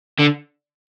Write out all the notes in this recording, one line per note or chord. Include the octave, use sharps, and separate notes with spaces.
D3